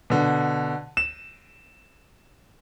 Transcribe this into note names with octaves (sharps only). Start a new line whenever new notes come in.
B2 D3
E7